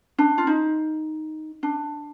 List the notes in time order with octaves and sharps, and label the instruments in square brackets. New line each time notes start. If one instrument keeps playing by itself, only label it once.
[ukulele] D4
F4
D#4
D4